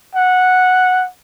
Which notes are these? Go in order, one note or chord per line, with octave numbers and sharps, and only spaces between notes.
F#5